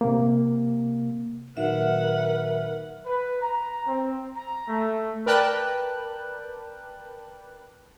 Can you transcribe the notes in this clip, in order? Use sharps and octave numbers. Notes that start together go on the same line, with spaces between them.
C3 A#3
A#2 D#3 F#3 A#4 B4 E5 F#5
B4
A#5
C4
A#5
A3
A#4 B4 D5 G5 A5 F#6